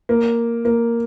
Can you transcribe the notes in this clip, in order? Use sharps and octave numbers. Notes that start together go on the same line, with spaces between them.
A#3
A#3